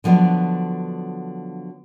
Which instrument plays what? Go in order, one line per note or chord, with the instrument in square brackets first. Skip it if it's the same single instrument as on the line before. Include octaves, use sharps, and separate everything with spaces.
[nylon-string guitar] D3 F3 F#3 B3 D4